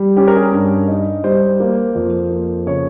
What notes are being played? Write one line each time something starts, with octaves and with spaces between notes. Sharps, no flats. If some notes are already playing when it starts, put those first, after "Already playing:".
Already playing: G3
C#4 G4
A#4
G#4
G2
D#4
G3 C5
A#3
F2
A#3
C#3 C#5